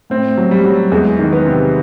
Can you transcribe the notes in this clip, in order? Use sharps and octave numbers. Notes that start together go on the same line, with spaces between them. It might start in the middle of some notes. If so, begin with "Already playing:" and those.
A2 C4
F#3
G3
F#3
E2 G#3
D#3
B3
C3